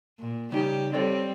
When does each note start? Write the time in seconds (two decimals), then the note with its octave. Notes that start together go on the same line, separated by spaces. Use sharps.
0.19 A#2
0.52 C#3 G3 D#4 G4
0.93 G3 C4 A4 C#5 D5